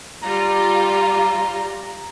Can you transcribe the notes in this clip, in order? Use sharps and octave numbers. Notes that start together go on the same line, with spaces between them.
G3 F4 A#5